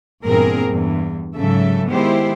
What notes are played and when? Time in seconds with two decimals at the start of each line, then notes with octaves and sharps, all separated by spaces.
0.24 E2 G2 A#2 C4 G#4 A#4
0.65 E2 G2
1.35 G#2 C#3 F#3 A4 E5
1.88 D#3 G#3 B3 E4 G4 C5